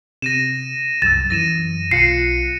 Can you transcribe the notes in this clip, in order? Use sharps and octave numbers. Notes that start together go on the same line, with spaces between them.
C3 A#6 D#7 E7
C2 F#2 E6 A6 E7
F#2 E3 A#6 D#7 E7
B1 F4 F#6 C7 C#7 D#7